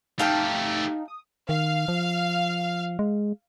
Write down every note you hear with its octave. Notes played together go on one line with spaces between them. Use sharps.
A3 D#4 G4 F5 G5 A5
D#6
D#3 F5
F3
G#3